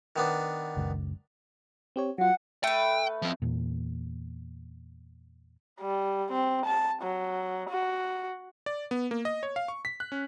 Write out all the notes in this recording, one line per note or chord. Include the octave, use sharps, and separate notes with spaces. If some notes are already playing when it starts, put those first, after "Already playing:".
D#3 B3 D4
F#1 C#2
C4 G4 C#5
F#3 F4 F#5
A3 B4 G5
F3 C4
E2 A#2
G3
C4
A5
F#3
F#4
D5
B3
A#3
D#5
C#5
F5
C#6
B6
F#6
C#4